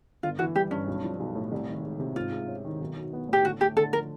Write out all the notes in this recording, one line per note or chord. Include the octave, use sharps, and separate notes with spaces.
G1 F4
E3 F#4
G3 G4
G2 C#4
B1
F3
B1
A2
C2
D#3
G#3
C3
G#2 F4
G#3
C#4
D#3
B1
F#3
B3
A2 G4
D3 F#4
A3 G4
D3 A4
F3 A#4